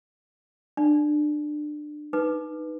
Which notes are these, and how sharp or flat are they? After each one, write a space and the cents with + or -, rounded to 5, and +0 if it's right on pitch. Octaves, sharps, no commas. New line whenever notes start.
D4 +25 D5 +0
D#4 -5 B4 +0 D6 +20